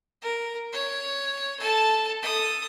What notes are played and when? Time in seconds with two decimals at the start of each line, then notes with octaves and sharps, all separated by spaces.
0.22 A#4
0.73 C#5
1.60 A4 A5
2.22 A4 D#6